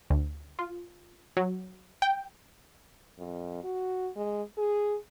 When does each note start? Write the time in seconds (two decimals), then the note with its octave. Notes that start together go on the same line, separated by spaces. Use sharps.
0.10 D2
0.59 F4
1.37 F#3
2.02 G5
3.19 F2
3.64 F#4
4.16 G#3
4.58 G#4